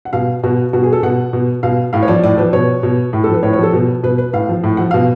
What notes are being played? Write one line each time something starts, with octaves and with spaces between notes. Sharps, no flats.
F#5
B2 F5
B2 F#4
B2 F#4
G#4
A4
B2 F#5
B2
B2 F5
A2 F5
C#5
F3 D5
A2 D5
F3 B4
B2 C#5
B2
A2
A4
F3 B4
A2 C#5
C#5
F3 A4
B2
B2 B4
B4
A2 F5
F3
A2
F3 F#5
B2 F5